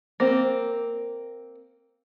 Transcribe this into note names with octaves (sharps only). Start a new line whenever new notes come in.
A#3 C4